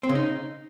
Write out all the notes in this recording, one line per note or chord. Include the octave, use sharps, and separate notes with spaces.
C4
C#3
D#4